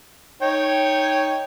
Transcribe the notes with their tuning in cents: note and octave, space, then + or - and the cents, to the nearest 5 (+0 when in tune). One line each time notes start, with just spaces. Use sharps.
D#4 +0 C#5 +0 G5 +0